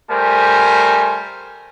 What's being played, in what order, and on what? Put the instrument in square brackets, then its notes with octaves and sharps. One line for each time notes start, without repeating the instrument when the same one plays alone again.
[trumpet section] G3 A3 A#4 C5 G#5